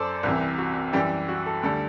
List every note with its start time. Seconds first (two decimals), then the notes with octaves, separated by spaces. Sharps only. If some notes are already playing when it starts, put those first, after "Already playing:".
Already playing: F#2 A4 C5 D5
0.23 C2 C3 E3
0.58 F#4
0.93 F#2 E3 G3 G4
1.28 F#4
1.46 A4
1.63 D2 D3 G3 A4